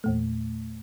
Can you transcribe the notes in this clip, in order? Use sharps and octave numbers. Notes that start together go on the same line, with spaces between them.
E2 A#2 A3